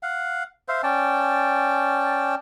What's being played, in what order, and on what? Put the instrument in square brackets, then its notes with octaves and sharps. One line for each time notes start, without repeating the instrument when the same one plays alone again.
[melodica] F5 F#5
C5 E5 F5
C#4 D5 G5 A5